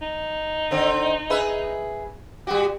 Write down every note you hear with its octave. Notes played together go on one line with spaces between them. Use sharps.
D#4
D3 C4
G#4 B4 E5
G3 F#4 G4